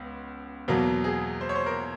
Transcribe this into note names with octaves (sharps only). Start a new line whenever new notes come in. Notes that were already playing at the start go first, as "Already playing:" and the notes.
Already playing: C#2 B3
E2 B2 F#3 A#3
G#4
C5
C#5
C5
A#4